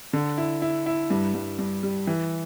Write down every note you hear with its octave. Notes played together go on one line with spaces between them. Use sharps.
D3
E4
E4
E4
G2
G2
G2
G3
E3